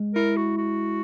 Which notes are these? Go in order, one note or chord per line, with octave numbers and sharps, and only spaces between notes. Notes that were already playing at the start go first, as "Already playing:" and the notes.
Already playing: G#3
E4 A#4
F#4
F#4